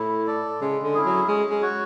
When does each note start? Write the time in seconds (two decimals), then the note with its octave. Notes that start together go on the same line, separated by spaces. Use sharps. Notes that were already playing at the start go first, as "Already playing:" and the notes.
Already playing: A2 E4
0.27 A4 D5
0.61 C#3 G#3
0.83 D3
0.94 C#4 E4 G#4
1.05 F#3
1.28 G#3 C#4
1.50 G#3
1.62 F#4 C#5